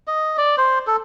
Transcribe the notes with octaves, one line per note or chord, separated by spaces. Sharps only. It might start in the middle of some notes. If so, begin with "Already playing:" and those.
D#5
D5
C5
A4